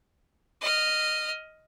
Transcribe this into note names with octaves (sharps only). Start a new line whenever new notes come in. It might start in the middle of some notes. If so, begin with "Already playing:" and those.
D#5 F6